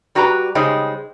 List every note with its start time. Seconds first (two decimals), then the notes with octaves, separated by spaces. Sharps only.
0.15 G3 F#4 G4 B4 A#5
0.55 C#3 G3 G#3 D#4 C5